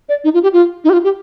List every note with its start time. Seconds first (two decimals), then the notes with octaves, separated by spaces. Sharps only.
0.09 D5
0.24 D#4
0.34 F4
0.43 G4
0.53 F4
0.84 D#4
0.90 G4
0.93 F4
1.04 G4